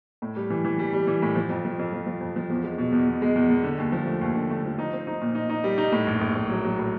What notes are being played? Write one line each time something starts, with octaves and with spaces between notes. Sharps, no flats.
A2
G3
E3
E3
G3
G3
E3
A2
F3
F2
F3
F2
F3
F3
F2
F3
E2
G#3
B2
E2
E2
G#3
E2
E2
D3
D#2
F3
A3
D#2
D3
A3
F3
D#4
C4
D#4
A#2
D#4
D#4
G3
D#4
A2
A#1
A#1
A#1
F#3
F#3
A2